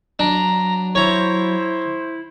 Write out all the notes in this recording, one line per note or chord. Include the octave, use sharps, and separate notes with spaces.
F#3 D4 A#5
E4 C5 C#5 A#5